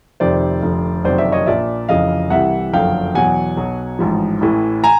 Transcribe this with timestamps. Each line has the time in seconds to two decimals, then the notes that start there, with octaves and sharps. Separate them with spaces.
0.20 F1 F2 C3 D#3 C5 D5
0.62 F1 F2 D3
1.04 F#1 F2 C3 D#3 F#3 C5 D5
1.18 D5 E5
1.32 C#5 D#5
1.46 A#1 A#2 F3 D5 E5
1.89 F1 F2 C#3 E3 D#5 F5
2.30 C2 C3 E3 E5 F#5
2.73 F#1 F2 D3 F#3 F5 G5
3.15 E2 B2 F#3 F#5 G#5
3.57 B1 B2 F#3
3.99 A1 G#2 F3
4.41 A1 A2 E3
4.84 G#5 A#5